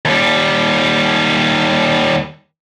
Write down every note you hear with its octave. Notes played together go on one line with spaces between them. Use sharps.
D#2 G3